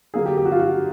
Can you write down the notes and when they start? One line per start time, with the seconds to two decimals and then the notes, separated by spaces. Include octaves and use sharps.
0.14 D3 F#3 A#3 D4 G#4
0.26 G4
0.37 G4
0.45 F#4
0.52 F4
0.59 F#4